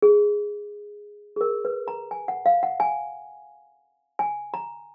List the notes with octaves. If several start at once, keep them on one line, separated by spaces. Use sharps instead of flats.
G#4
G#4
A#4
B4
A#5
G#5
F#5
F5
F#5
G#5
G#5
A#5